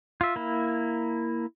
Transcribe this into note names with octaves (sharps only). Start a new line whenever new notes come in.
F4 E5
A#3 E4